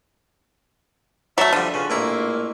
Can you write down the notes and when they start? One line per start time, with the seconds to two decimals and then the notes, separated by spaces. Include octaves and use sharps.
1.38 F#3 A3 D5 E5 A5 B5
1.53 D3 F3 G3 D#6
1.74 C#3 F4 B4
1.90 A1 A#2 G#3 A#3 E4 A#5